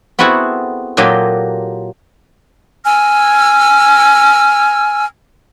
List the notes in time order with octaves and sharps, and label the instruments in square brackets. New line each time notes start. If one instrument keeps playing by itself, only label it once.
[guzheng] B3 C4 E4 F#4 G#4 A4
A#2 F#3 A#3 G4 A4 D#5
[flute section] G#5 E6 F6